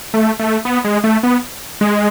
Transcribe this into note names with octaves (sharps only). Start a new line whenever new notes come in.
A3
A3
B3
G#3
A3
B3
G#3